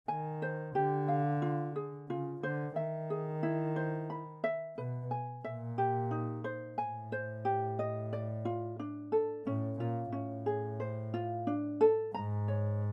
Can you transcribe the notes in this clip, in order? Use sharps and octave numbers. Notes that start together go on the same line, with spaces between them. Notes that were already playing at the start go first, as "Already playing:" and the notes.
D#3 G#5
C5
D3 G4
F5
F4
G#4
C#3 F4
D3 C5
D#3 E5
G#4
E4
C5
B5
E5
B2 B4
G#5
A#2 E5
G4
D#4
C5
A2 G#5
C5
G4
D#5
D5
F4
D4
A4
A2 C#4
A#2 F4
A2 C#4
G#4
C5
F4
D4
A4
G#2 A#5
C#5